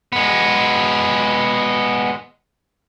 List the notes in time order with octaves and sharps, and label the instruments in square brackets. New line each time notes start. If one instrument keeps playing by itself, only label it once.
[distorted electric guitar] G#3 B3